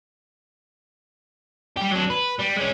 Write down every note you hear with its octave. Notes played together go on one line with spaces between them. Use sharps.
G3 G4
F#3 D4
B4
G3
G#3 C#4